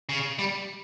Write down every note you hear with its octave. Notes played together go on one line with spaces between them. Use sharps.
C#3
G3